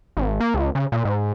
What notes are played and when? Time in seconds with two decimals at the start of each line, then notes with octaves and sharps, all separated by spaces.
0.17 G#1
0.40 A#3
0.54 C#2
0.75 C#3
0.92 A#2
1.05 G#2